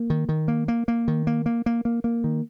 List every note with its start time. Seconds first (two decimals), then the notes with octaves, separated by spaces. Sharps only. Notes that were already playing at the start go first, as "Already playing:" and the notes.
Already playing: A#3
0.10 D#3
0.29 D#3
0.48 A#3
0.68 A#3
0.88 A#3
1.08 D#3
1.27 A#3
1.46 A#3
1.66 A#3
1.85 A#3
2.04 A#3
2.24 D#3